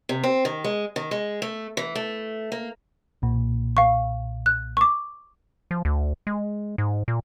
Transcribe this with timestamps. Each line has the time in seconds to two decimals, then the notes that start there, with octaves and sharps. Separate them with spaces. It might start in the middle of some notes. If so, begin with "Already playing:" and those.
0.09 C3
0.24 C4
0.45 D#3
0.64 G#3
0.96 D#3
1.11 G#3
1.42 A3
1.77 E3
1.95 A3
2.52 A#3
3.22 B1 A#2
3.77 F5 C#6
4.46 F#6
4.77 C#6 D6
5.71 F3
5.85 D2
6.27 G#3
6.78 G#2
7.08 A#2